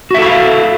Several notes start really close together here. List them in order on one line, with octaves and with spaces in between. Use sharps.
F#4 E5 A4 E4 F5